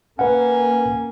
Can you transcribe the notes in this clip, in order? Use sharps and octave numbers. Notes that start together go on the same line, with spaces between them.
A#3 C#4 B4 F#5